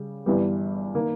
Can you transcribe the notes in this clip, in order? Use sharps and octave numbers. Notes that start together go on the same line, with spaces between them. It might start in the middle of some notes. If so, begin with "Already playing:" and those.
Already playing: C#3 G3
G1 G2 E3 G3 B3
D#3 A#3